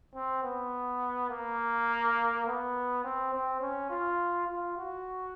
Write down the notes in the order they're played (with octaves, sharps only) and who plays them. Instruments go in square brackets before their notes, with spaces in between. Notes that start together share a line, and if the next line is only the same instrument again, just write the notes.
[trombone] C4
B3
A#3
B3
C4
C4
C#4
F4
F4
F#4